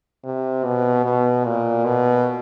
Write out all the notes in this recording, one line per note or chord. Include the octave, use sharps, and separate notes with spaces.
C3
B2
B2
A#2
B2